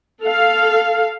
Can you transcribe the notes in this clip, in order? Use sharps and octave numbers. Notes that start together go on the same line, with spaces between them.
A4 F5